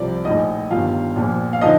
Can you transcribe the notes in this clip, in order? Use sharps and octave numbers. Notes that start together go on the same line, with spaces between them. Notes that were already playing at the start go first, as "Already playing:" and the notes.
Already playing: C2 C3 F3 D5
A#1 A2 F3 D#4 D#5
G1 G2 D#3 F4 F5
A#1 A#2 F3
F5
D3 F3 D#4 D#5